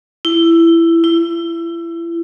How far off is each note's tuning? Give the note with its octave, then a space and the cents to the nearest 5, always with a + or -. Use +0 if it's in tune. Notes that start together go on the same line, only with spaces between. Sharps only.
E4 +15
E4 +30